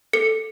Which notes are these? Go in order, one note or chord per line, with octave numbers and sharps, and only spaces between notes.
A4 C#7